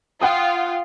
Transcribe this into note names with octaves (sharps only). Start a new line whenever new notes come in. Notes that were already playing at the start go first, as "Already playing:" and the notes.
F4 F#5 G5 D#6